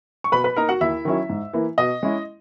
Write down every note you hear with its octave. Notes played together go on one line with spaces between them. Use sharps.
C#6
B2 B4 B5
B4 B5
A#3 D#4 A#4 A#5
F#4 F#5
D#2 E4 E5
D#3 F#3 C#4 E4
G#2
E3 A#3 E4
B2 D#5
G#3 C#4 E4